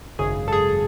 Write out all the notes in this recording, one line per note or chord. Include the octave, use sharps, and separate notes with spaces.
G#1 F#2 C#3 G#4
A4
G#4